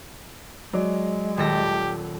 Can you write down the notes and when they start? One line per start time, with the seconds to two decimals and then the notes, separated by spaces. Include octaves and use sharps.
0.73 F#3 G#3 D5
1.37 D#1 G4 A4 A#6